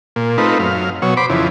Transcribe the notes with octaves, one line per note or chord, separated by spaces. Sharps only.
A#2
A3 C4 D#4 F4 B4
F#2 F5
B2 F#3 C#5
C5 B5 D6
F2 C#3 E3